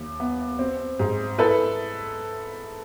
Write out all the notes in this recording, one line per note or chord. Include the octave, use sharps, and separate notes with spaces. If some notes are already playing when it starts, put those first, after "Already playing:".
Already playing: D#2
B3
C4
G#2
E4 A4 B4